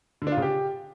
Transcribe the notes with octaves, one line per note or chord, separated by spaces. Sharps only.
D3
D4
F4
C#3
G4